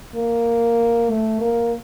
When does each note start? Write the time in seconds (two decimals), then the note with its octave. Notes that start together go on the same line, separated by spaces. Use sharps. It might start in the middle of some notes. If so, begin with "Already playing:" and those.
0.16 A#3
1.10 A3
1.41 A#3